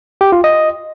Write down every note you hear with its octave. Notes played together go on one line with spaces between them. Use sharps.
G4
F4
D#5